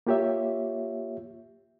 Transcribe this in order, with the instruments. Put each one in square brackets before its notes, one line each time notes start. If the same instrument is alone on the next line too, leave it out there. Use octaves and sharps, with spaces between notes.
[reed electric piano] A#3 F4 G4 C#5 E5